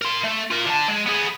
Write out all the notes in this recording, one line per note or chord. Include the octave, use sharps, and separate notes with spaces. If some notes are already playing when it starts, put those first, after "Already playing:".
A#4 C6
A3
F4 A#4
D3 A5
G#3
B3 G#4